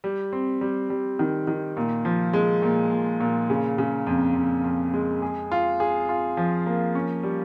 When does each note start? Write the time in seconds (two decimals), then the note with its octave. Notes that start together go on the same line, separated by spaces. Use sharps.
0.04 G3
0.33 C4
0.61 G3
0.90 G3
1.19 D#3
1.47 D#3
1.77 A#2
2.05 F3
2.33 G#3
2.62 A#2
2.92 A#2
3.20 A#2
3.50 C#3
3.78 C#3
4.07 F2
4.35 F2
4.64 F2
4.94 G#3
5.22 G#4
5.52 F4
5.80 G#4
6.09 F4
6.37 F3
6.66 A#3
6.95 C#4
7.23 G3